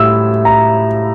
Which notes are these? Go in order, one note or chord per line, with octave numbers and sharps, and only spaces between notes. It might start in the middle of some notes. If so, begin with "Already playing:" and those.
Already playing: A2 G3 E4 E6
A#5